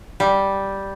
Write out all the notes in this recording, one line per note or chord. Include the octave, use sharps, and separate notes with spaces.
G3